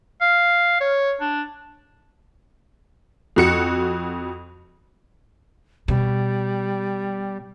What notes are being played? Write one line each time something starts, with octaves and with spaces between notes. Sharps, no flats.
F5
C#5
D4
F2 F#4 C#7
B2 G3